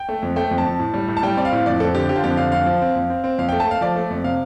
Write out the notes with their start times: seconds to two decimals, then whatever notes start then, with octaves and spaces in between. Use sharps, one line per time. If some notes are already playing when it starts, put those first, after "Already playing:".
Already playing: G5
0.09 A3
0.23 F2
0.36 A3 G5
0.51 F2
0.58 A5
0.65 F2
0.79 A2
0.94 G3
1.08 A2
1.17 A5
1.23 G3 G5
1.37 C4 D5
1.45 F5
1.52 A2
1.66 F2 D5
1.80 F2 A4
1.95 D3 G4
2.09 D3 G4
2.16 F4
2.24 F2 G4
2.37 D3 F5
2.52 F2 F5
2.66 F3
2.81 C4
2.95 F2
3.10 C4
3.24 C4
3.38 F2 F5
3.49 A3 G5
3.60 A5
3.67 A3 F5
3.81 F3 D5
3.96 A3
4.10 F2
4.24 C3 F5